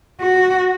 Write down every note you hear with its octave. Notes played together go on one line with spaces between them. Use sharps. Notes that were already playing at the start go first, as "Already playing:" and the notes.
F#4